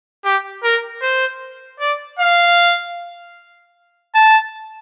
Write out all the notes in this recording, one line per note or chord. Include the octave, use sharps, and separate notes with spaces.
G4
A#4
C5
D5
F5
A5